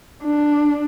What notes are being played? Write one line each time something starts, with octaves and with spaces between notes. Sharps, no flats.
D4